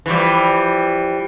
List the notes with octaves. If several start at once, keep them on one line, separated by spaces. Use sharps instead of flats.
E3 F3 G3